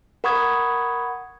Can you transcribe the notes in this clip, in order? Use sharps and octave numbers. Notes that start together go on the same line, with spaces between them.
A#4 F#5 B5 C#6 D#6 G#6